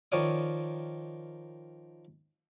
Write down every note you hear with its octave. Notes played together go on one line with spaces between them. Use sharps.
D#3 F3 C#5 D5 D#6